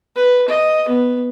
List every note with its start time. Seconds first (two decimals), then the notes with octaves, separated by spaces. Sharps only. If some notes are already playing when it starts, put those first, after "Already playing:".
0.16 B4
0.48 D#5
0.88 B3